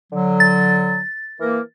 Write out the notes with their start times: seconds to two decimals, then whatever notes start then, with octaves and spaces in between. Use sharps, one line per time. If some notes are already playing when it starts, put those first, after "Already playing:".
0.12 D3 F#3
0.40 A6
1.40 E3 A#3 A#4